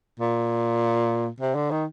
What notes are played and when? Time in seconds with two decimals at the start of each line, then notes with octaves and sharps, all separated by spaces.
0.19 A#2
1.40 C3
1.55 D3
1.71 D#3